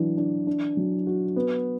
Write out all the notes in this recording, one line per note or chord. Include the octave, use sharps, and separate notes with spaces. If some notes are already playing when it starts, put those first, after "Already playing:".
Already playing: E3 F#3 D4
D4
D4
F#3
F#4
B3